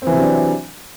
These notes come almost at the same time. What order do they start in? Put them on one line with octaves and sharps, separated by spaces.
C4 E3 C3 F#3 D4